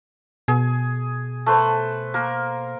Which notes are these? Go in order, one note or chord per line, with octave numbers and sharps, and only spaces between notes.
B2 G#4
A3 B4 C5
A#3 A#4